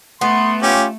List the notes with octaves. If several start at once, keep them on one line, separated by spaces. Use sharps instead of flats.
A3 B3 C6
C#4 F4 G4